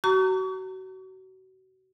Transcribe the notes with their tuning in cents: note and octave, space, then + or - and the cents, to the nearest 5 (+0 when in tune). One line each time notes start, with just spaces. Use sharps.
F#4 +30 A#5 -30 C#6 +40